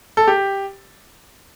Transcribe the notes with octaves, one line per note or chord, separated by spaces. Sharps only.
A4
G4